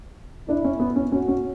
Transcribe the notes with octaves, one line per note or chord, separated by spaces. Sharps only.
D4 E4
C#4
B3
C#4
C#4 F#4
C#4